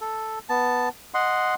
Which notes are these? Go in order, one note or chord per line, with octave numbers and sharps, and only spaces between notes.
A4
B3 A5
D#5 F#5 C6